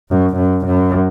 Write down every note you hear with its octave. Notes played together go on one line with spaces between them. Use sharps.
F#2
F#2
F#2